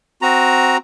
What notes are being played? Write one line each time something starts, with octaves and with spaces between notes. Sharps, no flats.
C4 F#4 A#5